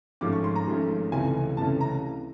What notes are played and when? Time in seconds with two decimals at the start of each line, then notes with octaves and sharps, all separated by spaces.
0.21 G#1 G#2 F3 A3 C#4 D6
0.32 C#6
0.44 C6
0.56 A#5
0.67 G#1 G#2 F3 A3 C#4
1.12 C#2 C3 E3 A3 C#4 G#5
1.57 C#2 C3 E3 A3 C#4 A5
1.81 A#5